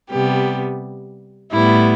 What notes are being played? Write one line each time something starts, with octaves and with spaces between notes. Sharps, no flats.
C3 G3 B3 G4
A2 G3 B3 E4